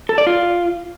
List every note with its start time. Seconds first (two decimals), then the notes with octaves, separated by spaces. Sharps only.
0.09 A4
0.18 D5
0.27 F4